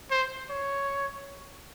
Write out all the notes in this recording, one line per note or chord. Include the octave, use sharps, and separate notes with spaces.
C5
C#5